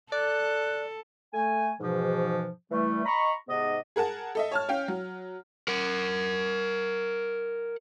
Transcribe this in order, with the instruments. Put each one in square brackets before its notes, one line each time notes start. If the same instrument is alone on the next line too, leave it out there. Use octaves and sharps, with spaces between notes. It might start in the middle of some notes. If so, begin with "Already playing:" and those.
[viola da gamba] A4 [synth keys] D5 [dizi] F#6
[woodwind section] A3 G#5
G#2 B2 E3 F3
E3 G3 A3
D#5 A#5 B5 C#6
G#2 C3 B3 D#5
[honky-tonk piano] G#4 A#4 F#5 A5
A4 D#5 E5
C#5 A5 F6
C#4 F5 G5
F#3
[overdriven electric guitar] A#4 F#5